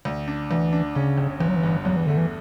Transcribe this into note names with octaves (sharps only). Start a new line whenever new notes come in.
D2
D4
D2 E3
D4
C#3 C#4
G1
G1 E3
F#3
E3
G2
E2 F#3
E3
D3 A3
E3